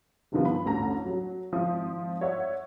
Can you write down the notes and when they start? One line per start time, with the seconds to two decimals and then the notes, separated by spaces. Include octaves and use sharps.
0.32 F#1 G2 C3 D#3 F3 B3
0.45 B5
0.65 A1 D2 A5 A#5 A#6
1.06 F#3
1.53 G#1 F3 E4 D#6
2.21 C#5 D5 E5 F#5